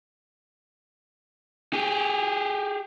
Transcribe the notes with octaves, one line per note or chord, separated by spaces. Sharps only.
G4 G#4